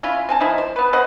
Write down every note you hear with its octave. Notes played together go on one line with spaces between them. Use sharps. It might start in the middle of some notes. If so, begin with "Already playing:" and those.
C#4 E4 F4
C4 G#5 A5
F3 D#4 E4 C5
C5
B3 B4
B4 C5 D#5 F#5